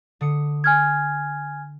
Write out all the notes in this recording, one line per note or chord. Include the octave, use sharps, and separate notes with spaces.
D3 D#6 C#7
G#5 F6 G#6